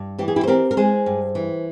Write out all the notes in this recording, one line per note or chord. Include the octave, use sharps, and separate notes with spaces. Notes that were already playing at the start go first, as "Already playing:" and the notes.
Already playing: G2
E3 G4
G#4
E4 G4
C5
C4 G4 A#4
A#4
G#3 G#4 C5
G2
E3